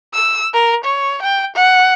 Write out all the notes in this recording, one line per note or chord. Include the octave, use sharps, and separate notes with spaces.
E6
A#4
C#5
G5
F#5